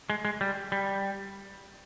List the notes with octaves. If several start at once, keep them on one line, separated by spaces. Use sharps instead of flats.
G#3
G#3
G3
G3